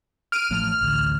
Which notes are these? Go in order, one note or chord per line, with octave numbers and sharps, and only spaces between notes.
F6 D7 D#7
A1 F3 A3 F6
A1 D2